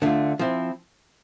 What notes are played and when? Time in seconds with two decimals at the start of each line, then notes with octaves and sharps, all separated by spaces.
0.02 D3 A3 D4 F4
0.39 F3 C4 E4